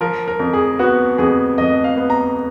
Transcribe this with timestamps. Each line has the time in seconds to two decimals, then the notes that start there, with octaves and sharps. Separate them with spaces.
0.01 F3 A#4
0.28 A#4
0.40 F2
0.53 G#4
0.79 B3 F#4
1.18 F2 G#4
1.58 F2 D#5
1.84 F5
1.97 B3
2.10 A#5